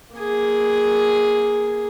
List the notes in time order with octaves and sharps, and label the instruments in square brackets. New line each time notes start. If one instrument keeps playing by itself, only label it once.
[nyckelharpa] A#3 G#4